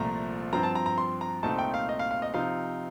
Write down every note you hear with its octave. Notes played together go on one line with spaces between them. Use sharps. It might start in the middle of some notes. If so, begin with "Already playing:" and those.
Already playing: C2 A#2 F3 A3 A#5
G2 F3 C4 A#5
A5
A#5
A#5
C6
A#5
C2 A#2 A3 C4 D#4 A5
G5
F5
D#5
F5
F5
D#5
C3 F3 C4 D#4 F5